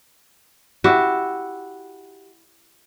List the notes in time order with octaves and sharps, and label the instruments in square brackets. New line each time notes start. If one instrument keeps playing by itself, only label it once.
[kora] E4 F#4 G4 E5